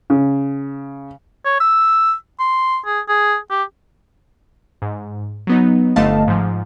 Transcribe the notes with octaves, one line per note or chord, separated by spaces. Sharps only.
C#3
C#5
E6
C6
G#4
G#4
G4
G#2
F#3 B3 D#4
G1 D3 A3 D#5 F5 A5
G#2 F3